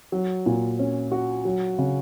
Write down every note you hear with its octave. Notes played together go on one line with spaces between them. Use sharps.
F#3
A#2
C#4
F#4
F#3
C#3